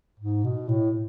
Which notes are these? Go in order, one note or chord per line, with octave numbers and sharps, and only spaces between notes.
G#2
B2
A2